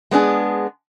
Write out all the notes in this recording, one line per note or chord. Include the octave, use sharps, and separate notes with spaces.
G#3 B3 D4 G#4